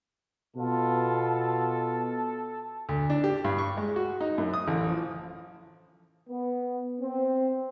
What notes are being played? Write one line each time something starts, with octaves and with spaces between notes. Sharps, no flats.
B2 F4 A4
D2
D4
G4
G2
C#6
G#3
F#4
D#4
F#2
D#6
A1
F3
B3
C4